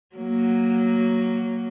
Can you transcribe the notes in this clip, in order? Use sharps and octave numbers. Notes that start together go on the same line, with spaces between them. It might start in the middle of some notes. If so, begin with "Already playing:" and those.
F#3 A#3